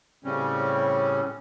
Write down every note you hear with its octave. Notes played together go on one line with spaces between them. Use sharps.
A2 C#3 G3 C4 C#4